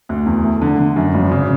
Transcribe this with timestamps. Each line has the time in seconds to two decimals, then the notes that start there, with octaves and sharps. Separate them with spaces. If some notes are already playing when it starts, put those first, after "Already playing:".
0.09 D2
0.26 E2
0.43 A3
0.62 D3
0.79 D3
0.96 F#2
1.14 G#1
1.31 C#3